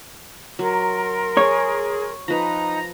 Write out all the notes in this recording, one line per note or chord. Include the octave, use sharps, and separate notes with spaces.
F#3 A#4 C6
G#4 C#5
F3 D#4 B4 A#5